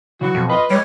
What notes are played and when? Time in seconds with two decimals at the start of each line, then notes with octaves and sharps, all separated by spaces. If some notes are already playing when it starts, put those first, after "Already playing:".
0.21 C#3 E3 F#3 F#4
0.35 F2 B2
0.50 F4 B4 D#5
0.70 G3 G#3 C#5